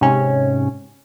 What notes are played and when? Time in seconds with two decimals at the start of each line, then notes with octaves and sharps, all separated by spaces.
0.01 G#2 C3 C#4